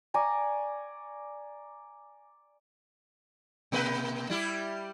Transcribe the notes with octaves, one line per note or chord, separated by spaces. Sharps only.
D5 G#5 A#5 C#6
B2 A#3 B4
G3 E4 G4